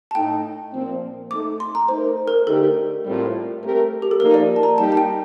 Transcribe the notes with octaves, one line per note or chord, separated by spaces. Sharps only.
A5
A2 A3 D#4 G5
A#2 F3 C4
A3 D#4 A4 D6
C6
A#5
A3 D#4 A#4 C5
A#4
D3 A3 D#4 G4 A4
A2 G3 C4 F4 A#4
A3 C4 G4 A#4
G4
A4
F3 A#3 D#4 A#4
D5
A5
A#5
G3 A#3 D#4 G4 A5
A5
G5